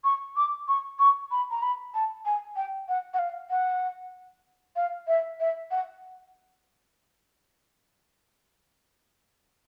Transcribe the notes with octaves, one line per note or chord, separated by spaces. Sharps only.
C#6
D6
C#6
C#6
B5
A#5
B5
A5
G#5
G5
F#5
F#5
F5
F#5
F5
E5
E5
F#5